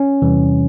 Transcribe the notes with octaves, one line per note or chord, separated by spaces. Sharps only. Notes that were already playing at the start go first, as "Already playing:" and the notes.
Already playing: C#4
E2 C3 E3 G3